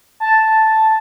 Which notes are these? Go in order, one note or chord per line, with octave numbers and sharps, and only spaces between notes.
A5